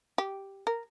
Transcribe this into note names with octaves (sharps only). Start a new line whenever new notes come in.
G4
A#4